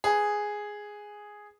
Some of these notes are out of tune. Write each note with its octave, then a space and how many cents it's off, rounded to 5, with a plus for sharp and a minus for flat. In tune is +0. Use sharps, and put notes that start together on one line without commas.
G#4 +0 B4 +0